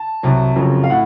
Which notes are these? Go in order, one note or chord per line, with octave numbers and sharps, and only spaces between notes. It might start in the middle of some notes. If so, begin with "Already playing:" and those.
Already playing: A5
C2 C3 F#3
F#1 F2 C#3 F#3
F5
A2 F#5